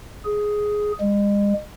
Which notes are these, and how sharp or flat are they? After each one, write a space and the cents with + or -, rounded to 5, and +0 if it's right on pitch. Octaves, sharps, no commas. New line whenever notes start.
G#4 +5
G#3 -40